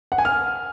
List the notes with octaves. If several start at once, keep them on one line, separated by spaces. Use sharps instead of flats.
F#5
G#5
F6